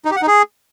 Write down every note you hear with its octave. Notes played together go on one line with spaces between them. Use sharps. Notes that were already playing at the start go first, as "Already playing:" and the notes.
D#4
G4
F#5
D#4
G#4